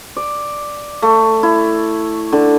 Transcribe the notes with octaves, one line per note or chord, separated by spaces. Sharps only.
D5
A3
E4
D3